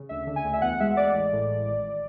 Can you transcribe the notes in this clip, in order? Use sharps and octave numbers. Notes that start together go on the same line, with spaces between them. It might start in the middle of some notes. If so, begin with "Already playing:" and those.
Already playing: C#3
D2 E5
D3
G#5
D2
E5
E2 F#5
G#3 E5
G#3 D5
A1
A2
A1
G#1